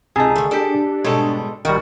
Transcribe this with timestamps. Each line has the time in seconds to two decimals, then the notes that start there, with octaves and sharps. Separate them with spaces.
0.16 C#2 C3 D#4 G#4 A5
0.36 D3 D#3 A3
0.51 D4 G4 A4 D5
1.05 G#2 B2 G3 G#3 A4 C#5
1.65 G#1 D#3 G3 F#4